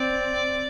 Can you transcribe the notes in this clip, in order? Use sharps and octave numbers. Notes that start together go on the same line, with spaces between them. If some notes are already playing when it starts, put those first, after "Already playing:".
Already playing: C4 D5